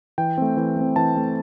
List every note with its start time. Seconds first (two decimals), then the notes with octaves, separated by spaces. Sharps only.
0.18 E3 G5
0.38 A3 C4
0.57 E3
0.77 A3 C4
0.96 E3 A5
1.15 A3 C4